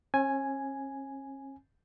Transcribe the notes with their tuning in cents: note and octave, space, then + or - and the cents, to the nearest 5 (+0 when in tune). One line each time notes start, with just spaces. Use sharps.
C#4 -40 G#5 +0